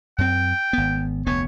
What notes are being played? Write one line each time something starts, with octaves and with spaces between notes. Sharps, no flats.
F#2 C4 G5
G#1 B3
F1 D2 B3 C#5